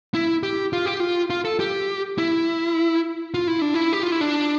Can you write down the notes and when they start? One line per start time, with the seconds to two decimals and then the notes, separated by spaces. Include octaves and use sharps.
0.14 E4
0.43 G4
0.73 F4
0.86 G4
1.00 F4
1.30 F4
1.45 A4
1.60 G4
2.18 E4
3.34 F4
3.48 E4
3.62 D4
3.74 E4
3.93 G4
4.03 F4
4.12 E4
4.21 D4